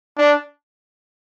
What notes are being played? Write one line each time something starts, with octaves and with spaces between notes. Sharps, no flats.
D4